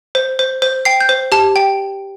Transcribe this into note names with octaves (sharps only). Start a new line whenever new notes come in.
C5
C5
C5
G5 C7
G6
C5
G4 A5
G5